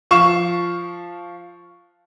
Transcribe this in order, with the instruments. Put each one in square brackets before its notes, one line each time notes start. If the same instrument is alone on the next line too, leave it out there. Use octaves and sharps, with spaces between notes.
[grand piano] F3 F5 C#6 E7